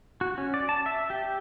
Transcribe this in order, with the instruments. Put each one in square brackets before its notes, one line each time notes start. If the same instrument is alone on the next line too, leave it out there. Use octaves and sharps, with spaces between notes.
[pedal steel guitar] F#4
C#4
D5
A5
E5
G4